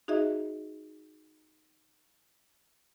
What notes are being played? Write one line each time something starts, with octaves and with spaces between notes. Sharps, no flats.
D#4 F#4 G#4 D#5 E5